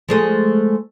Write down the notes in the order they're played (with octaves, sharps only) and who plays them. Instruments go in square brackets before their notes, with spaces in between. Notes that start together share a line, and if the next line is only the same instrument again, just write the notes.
[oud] F3 G#3 A3